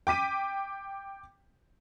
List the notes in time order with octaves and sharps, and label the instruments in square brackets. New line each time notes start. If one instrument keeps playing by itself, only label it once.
[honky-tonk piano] G5 D6 B6 D#7